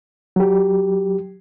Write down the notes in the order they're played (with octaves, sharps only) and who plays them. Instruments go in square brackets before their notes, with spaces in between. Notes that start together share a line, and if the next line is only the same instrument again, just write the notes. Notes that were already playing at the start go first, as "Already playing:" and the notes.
[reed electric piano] F#3 G4